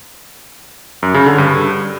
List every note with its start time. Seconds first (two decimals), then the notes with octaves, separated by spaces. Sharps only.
1.03 F#2
1.14 C#3
1.26 D3
1.38 G2